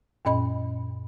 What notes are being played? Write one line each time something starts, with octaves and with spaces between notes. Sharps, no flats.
F#2 A#2 C#4 D#5 B5